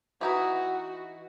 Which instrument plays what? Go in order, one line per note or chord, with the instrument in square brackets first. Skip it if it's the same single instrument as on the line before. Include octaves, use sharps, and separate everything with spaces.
[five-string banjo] E3 D#4 E4 [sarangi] F#4